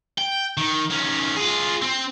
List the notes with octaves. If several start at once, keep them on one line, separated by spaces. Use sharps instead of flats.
G5
D#3
D#3 C#4
F4 G#4
C4